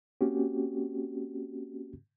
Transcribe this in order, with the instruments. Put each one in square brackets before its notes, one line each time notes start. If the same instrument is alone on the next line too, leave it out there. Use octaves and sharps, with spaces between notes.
[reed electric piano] A#3 C4 C#4 F#4 G4